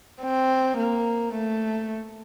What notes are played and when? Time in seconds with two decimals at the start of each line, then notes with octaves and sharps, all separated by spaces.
0.22 C4
0.77 A#3
1.34 A3